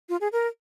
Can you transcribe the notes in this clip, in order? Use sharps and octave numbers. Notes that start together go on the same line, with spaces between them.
F4
G#4
A#4